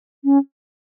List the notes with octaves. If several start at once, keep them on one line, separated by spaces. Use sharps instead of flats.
C#4